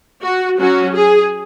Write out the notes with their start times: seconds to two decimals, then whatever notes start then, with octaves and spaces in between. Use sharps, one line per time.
0.23 F#4
0.59 F#3 C#4 F#4
0.95 G#4